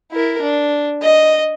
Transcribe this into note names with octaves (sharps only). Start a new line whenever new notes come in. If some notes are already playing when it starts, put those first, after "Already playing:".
E4 A#4
D4
D#5